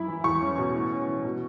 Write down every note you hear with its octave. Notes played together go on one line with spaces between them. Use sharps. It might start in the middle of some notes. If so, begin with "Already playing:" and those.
Already playing: F#2 E4 B5
E3
E2 C#6
C#4
B2
A2
C#4
E3
B2